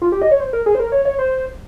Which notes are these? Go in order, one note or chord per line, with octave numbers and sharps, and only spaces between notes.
F4
G4
D#5
C#5
C5
A#4
G#4
C5
A#4
C#5
C#5
C5